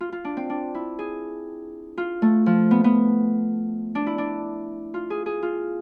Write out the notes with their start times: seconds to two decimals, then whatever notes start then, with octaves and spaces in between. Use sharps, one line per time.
0.01 F4
0.12 F4
0.25 D4
0.37 C4
0.50 D4
0.75 E4
0.99 G#4
1.98 F4
2.22 A3
2.46 F3
2.71 B3
2.84 B3
3.95 D4
4.07 E4
4.18 D4
4.94 F4
5.10 G#4
5.26 G#4
5.42 F4